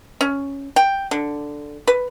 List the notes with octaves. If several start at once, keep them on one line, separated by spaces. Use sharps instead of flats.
C#4
G5
D3
B4